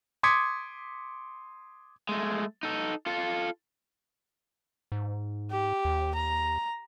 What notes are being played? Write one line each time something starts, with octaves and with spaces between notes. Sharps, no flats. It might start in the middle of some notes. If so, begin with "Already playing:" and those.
C6 D6 D#6 G#6 B6 C#7
G#3 A3
D#4 A4
F4 A4
G#2
G4
D#2
A#5